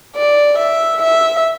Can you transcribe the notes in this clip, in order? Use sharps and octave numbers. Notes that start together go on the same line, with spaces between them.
D5
E5
E5